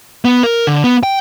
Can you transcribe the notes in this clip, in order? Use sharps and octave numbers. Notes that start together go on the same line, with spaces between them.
B3
A#4
D3
B3
G5